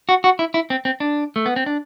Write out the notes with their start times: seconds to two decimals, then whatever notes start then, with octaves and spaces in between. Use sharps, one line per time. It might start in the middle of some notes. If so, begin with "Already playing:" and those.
0.09 F#4
0.24 F#4
0.39 E4
0.54 E4
0.70 C4
0.85 C4
1.00 D4
1.36 A3
1.46 B3
1.56 C4
1.66 D4